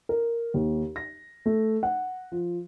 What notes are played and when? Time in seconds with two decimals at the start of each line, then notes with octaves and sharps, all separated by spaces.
0.09 A#4
0.54 D#2
0.96 A#6
1.46 A3
1.83 F#5
2.32 F3